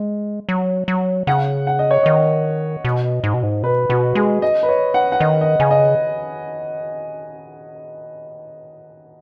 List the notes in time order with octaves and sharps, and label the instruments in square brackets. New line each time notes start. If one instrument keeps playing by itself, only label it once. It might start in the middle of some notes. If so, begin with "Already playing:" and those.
Already playing: [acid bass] G#3
F#3
F#3
[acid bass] C#3 [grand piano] F#5
[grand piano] F#5
D#5
C#5
[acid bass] D#3 [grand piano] D#5
[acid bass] B2
G#2
B2
G#2
[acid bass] B2 [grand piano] B4
[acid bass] B2 [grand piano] F#4
[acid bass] G#3 [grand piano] G#4
[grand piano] D#5
B4
C#5
F#5
F#5
[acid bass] D#3 [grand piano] D#5
[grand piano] D#5
[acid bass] C#3 [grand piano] G#5
[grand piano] D#5